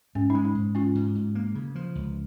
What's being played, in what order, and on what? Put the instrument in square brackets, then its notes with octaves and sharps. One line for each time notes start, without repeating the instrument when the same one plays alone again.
[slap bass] G#2 [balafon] C#4
[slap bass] G#3 [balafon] D#4
[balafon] D#4
[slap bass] G#2
[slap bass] G#2 [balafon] C#4 F4
[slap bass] G#2
G#2
A#3
C#3
F3
C#2